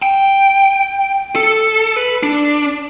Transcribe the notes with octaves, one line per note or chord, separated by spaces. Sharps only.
G5
A4
B4
D4